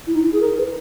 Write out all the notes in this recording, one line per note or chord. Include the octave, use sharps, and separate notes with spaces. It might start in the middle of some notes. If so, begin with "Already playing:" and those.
E4
D#4
E4
G#4
A#4
B4